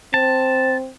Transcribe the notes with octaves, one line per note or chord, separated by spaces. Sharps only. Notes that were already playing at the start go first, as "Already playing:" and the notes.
C4 A5